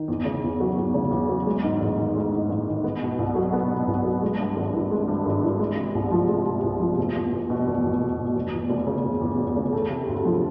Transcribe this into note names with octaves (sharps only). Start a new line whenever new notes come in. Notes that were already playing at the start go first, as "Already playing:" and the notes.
Already playing: D#3
E2
C#3
E2
F#3
E2
C#3
E2
F#3
G#3
G#2
A1
D#3
G#3
G#2
A1
D#3
B3
B2
C2
F#3
B3
B2
C2
F#3
G#3
G2
G#1
E3
G#3
G2
G#1
E3
G#3
C3
C2
F3
G#3
C3
C2
F3
F1
E2
F1
B2
F1
E2
F1
B2
F1
E2
F1
C#3
F1
E2
F1
C#3
A3
C3
D2
F3